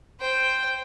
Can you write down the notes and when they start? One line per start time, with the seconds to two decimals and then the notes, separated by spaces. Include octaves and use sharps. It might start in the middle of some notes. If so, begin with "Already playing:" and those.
0.20 C5 G5